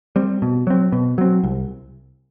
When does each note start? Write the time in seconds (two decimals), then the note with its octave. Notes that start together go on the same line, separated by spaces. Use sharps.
0.16 G3 C4
0.42 B2
0.67 F#3 C4
0.92 B2
1.18 F#3 C4
1.43 C2